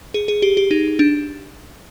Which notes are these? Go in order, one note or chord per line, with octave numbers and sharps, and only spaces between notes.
G#4
G#4
G4
G4
D#4
D4